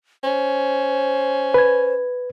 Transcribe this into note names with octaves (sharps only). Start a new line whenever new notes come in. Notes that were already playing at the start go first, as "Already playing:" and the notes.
C#4 C5
B4 G#6